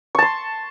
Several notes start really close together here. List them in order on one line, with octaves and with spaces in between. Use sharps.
C#6 A5 C6